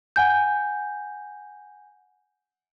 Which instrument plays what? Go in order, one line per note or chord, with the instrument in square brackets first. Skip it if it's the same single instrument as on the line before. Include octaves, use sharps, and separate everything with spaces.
[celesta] F#5 G#5 G6